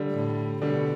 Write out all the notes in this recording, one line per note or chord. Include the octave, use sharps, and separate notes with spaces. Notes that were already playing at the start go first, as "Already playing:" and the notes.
Already playing: D3 G3
A2
B2 D3 G3